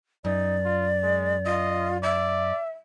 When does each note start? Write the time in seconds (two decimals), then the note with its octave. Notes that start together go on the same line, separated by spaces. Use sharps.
0.25 F#2 D#4 D5
0.65 F4
1.03 G#3
1.46 F4 D#5
2.02 D5 E5